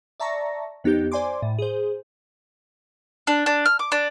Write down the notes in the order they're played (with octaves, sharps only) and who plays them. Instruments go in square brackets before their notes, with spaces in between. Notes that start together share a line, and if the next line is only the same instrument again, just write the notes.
[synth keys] D5 E5 A5 A#5 C#6 A#6
F2 B3 D#4 G4 G6
C5 D5 G#5 C6 D6
A2
G#4 C5
[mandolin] D4
D4
F6
D6
D4